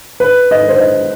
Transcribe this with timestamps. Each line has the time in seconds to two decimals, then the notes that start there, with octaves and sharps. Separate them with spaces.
0.20 B4
0.51 D#5
0.69 C5
0.80 D#5